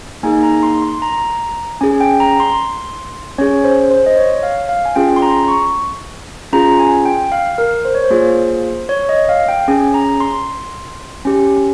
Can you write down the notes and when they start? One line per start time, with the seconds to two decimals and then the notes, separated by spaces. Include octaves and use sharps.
0.23 A#3 D#4 G#4 G#5
0.43 A#5
0.63 C6
0.82 C6
1.02 A#5
1.81 C#4 G#4 G#5
2.01 G5
2.20 A#5
2.40 C6
3.38 C#4 G#4 C#5
3.64 C5
3.91 C5
4.06 D#5
4.17 C#5
4.43 F5
4.69 F5
4.85 G#5
4.95 C#4 F4 G#4 G5
5.16 C6
5.22 A#5
5.48 C#6
6.53 C#4 F4 G#4 A#5
6.79 G#5
7.05 G5
7.32 F5
7.58 A#4
7.85 C5
7.95 C#5
8.04 C5
8.10 A#3 F4 G#4
8.89 C#5
9.09 D#5
9.29 F5
9.49 G5
9.68 C#4 G#4 G#5
9.94 A#5
10.20 C6
11.25 C#4 G4